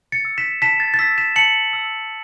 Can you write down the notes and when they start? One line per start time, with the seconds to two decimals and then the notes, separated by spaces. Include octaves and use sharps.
0.12 A6 C#7
0.25 E6
0.38 B6 E7
0.62 A5 B6 E7
0.80 A6
0.94 A6
0.99 E6 B6
1.18 B6 E7
1.36 A5 C#7 F#7
1.73 E6